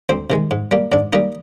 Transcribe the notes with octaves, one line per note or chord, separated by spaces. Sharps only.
D2 C4 C5
C3 D#3 G#3
G#2
G3 A#3
G#2 D4 D5
G3 A#3 D#4 D#5